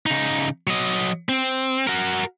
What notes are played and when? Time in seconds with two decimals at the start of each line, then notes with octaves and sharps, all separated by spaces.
0.06 C#3 D#4
0.67 F#3 D#5
1.29 C4
1.87 F#4 A#4